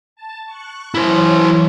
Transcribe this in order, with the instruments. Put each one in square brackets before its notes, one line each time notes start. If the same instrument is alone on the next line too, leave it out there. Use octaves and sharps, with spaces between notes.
[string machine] A5
C#6 F#6
[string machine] E3 F#3 C#5 [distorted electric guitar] E4 C5